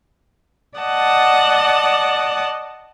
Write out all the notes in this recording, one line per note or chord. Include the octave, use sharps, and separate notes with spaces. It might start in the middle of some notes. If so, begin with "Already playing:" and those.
D5 D#5 F#5 A5